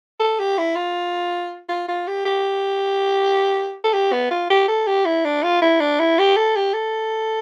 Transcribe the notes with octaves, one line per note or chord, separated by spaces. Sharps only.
A4
G4
E4
F4
F4
F4
G4
G4
A4
G4
B3
F4
G4
A4
G4
E4
D4
F4
E4
D4
E4
G4
A4
G4
A4